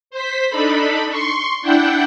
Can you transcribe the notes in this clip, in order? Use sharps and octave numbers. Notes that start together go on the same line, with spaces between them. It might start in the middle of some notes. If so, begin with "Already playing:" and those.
C5 B6
D4 D#4 A4 B5
C6 C#6
D4 E4 F#5 G5 G6